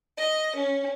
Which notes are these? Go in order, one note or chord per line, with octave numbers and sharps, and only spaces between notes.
D#5
C#4